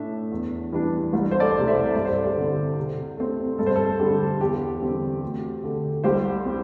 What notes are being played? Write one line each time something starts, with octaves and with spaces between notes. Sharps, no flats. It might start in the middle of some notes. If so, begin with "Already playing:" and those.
Already playing: A2 A3 D4 E5
E2
E3 G3 D4
C2
C5
A4 D5
C3 A3
C5 E5
G2 D5
C5
A4
G4 C5
D3
C4
C3
A3 C4
G2 A4
C5
A4
D3 G3 G4
E2 G4
D3 G3 C4
D2
D3 A3
C2 G4 C5
G3 C4